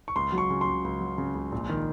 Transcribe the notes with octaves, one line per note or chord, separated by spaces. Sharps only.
C#6
C#2 C6
F#3
C#6
C#3
C6
C#2
C#2
F#3
C#3
C#2
A#1
D#3